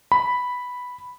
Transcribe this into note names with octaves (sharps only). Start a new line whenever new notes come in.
B5